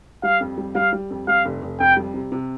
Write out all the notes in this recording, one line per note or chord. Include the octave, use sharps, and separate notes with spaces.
G3 F5
F2
G3
G3 F5
G3
F2
G3 F5
F1
F1
F2 G5
G3
C3
C3